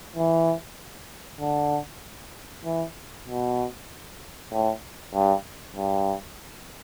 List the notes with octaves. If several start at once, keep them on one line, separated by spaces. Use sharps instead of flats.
E3
D3
E3
B2
A2
G2
G2